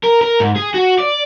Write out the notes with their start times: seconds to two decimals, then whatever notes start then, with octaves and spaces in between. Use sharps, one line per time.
0.04 A#4
0.22 A#4
0.40 G#2
0.56 G#4
0.74 F#4
0.99 D5